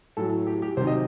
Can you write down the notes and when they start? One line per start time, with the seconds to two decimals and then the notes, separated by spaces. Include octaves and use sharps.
0.17 A2 F#3 A4
0.47 G4
0.62 G4
0.77 C3 D#3 F#3 C5
0.87 D#5